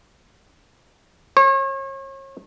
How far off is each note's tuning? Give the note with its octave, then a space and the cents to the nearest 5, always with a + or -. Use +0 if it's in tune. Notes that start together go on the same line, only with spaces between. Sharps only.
C#5 -40